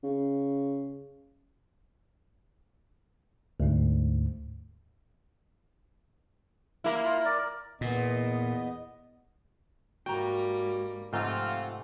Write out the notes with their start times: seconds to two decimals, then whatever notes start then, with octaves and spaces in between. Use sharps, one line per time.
0.03 C#3
3.60 D2 G#2
6.84 A#3 E4
7.05 F4 A#4
7.25 A#4 D5
7.81 E2 A#2 B3 D#5
10.06 G#2 G3 A#3 F#4 G5 A#5
11.13 G#2 C3 F3 A3 C4 F4 F#5